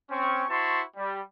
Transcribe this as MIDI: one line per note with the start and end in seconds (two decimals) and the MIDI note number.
0.10 0.44 60
0.10 0.44 61
0.10 0.44 85
0.49 0.81 64
0.49 0.81 66
0.49 0.81 72
0.49 0.81 81
0.49 0.81 84
0.49 0.81 85
0.96 1.20 55